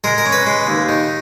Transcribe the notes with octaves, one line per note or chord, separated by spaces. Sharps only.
G#3 A#4
A#4
C#4
B4
G#3
D#2
D#3